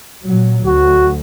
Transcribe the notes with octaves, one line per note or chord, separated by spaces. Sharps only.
A#2 F#3
D2 F#4